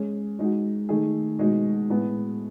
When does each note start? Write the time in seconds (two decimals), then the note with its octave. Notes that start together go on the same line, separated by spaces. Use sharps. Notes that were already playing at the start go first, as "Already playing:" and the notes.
Already playing: G#3 C#4 G#4
0.39 G#3 D#4 F#4
0.89 D#3 A3 D#4 G#4
1.39 B2 G#3 D#4 F#4
1.90 A2 G#3 B3 E4